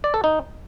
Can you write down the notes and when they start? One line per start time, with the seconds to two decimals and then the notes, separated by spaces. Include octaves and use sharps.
0.04 D5
0.14 A4
0.24 D#4